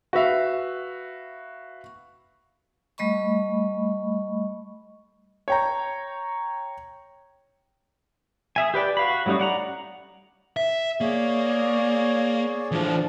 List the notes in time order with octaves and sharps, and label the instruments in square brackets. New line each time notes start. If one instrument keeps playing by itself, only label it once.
[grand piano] F#4 B4 E5 F5
[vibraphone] G3 A3 D#5 B5 C#6
[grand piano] C#5 G5 A#5
[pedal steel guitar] G#4 E5 G#5
G4 B4 D5 G5
F#4 F5 B5
F#3 G3 A3 C#4 D#4
D5 F#5 A#5
[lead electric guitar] E5
[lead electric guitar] A#3 [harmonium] G#4 C#5 D5
[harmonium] A2 F3 D4 [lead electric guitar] E3 F4